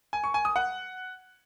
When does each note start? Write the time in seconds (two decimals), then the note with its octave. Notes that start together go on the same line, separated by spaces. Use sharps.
0.13 G#5
0.24 C#6
0.34 G#5
0.45 D#6
0.56 F#5